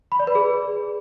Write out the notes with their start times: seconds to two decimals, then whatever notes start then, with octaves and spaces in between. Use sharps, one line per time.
0.12 B5
0.19 D5
0.27 B4
0.35 G#4